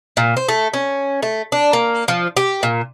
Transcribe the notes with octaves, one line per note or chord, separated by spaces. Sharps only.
A#2
C5
A3
C#4
A3
D4
A#3
F3
G4
A#2